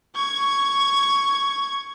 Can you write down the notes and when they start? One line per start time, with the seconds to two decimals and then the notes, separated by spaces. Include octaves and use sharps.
0.15 C#6 G#6